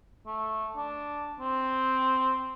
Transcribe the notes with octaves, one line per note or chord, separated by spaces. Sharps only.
A3
D4
C4